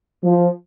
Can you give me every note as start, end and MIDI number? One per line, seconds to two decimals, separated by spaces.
0.24 0.49 53